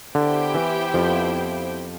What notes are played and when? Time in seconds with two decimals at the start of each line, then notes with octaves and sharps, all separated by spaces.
0.15 D3 B3 E4 G4 C5 G5
0.55 E3
0.94 F2 F3